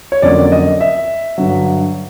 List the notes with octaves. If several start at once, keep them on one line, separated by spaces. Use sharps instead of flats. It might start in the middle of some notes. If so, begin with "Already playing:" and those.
C#5
F2 D3 F#3 A#3 C#4 D5
D#5
E5
G2 D3 F#3